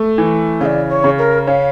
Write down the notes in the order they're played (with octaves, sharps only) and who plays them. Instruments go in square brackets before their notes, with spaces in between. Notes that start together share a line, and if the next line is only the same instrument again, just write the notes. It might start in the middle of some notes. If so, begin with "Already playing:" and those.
Already playing: [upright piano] A3
E3
[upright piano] C#3 [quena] F5
[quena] D5
C#5
[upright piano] C#3
[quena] A#4
[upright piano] C#4 [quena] F5